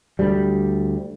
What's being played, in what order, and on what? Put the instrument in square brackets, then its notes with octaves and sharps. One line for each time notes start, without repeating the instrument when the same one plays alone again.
[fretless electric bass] D2 G3